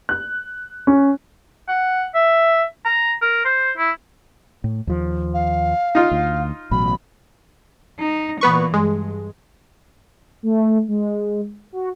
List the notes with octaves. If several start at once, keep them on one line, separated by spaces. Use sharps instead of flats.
F#6
C#4
F#5
E5
A#5
A#4
C5
E4
A2
D#2 F3
F5
D#4 F4
D2
A1 B2 F#3 B5
D#4
A#2 E3 B3 B4 C#6
G2 G#3
A3
G#3
F#4